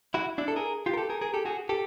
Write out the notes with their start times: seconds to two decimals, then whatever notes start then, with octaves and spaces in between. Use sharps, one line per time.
0.14 E4 F#4
0.38 D4 E4
0.48 A4
0.56 G#4 A#4
0.86 F4 G4
0.93 A#4
0.97 G4 A4
1.10 G#4 A#4
1.21 G#4 A#4
1.34 G4 A4
1.45 F#4 G#4
1.69 G4 A4